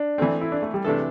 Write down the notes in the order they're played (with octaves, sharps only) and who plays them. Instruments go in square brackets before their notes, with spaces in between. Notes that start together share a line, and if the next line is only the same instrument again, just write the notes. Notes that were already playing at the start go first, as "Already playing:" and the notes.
Already playing: [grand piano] D4
[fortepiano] E3 A3 C4
[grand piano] E4
D4
A3
G3
[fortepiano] C3 A3 D4 A4 [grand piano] E3